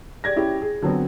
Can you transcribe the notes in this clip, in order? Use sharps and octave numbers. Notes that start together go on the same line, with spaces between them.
G4 D5 G#6 A#6
C#4 E4 G4
G#4
D3 F#3 B3 C4